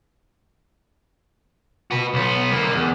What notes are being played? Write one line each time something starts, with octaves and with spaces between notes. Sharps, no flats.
F#4 B4
B1 B3
D3 A#3
E2